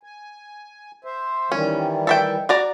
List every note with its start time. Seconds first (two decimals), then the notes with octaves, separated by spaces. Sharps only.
0.03 G#5
1.04 C5 E5
1.52 D#3 E3 G3 C#4
2.07 A4 E5 G5
2.49 F#4 D5 A#5